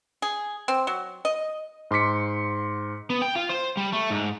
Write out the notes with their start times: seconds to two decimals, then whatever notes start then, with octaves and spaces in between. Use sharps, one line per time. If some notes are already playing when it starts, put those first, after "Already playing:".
0.22 G#4
0.68 C4
0.87 F#3
1.25 D#5
1.91 G#2 C6 D6 B6 C#7
3.10 B3
3.22 G5
3.35 F4
3.49 C5
3.77 G3
3.92 A3
4.10 G#2